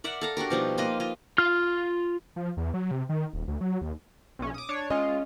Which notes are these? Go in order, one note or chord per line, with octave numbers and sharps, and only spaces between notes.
A#4 D5 E5 F#5
A4 F5 A#5
D4 F#4 G4 A#4
B2 F3 G3 D#4
A#3 F4 B4 D#5
F4 D#5
F4 C6 F6
F3
E2
F#3
C3
D#3
D#1
D2
F#3
D#2
B1 C#4
D6 D#6
D4 C#5
G#3 C#4 F4 D#5